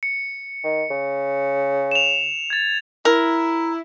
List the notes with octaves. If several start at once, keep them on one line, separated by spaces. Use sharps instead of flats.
C#7
D#3
C#3
E7 F7
G#6 A6
E4 A#4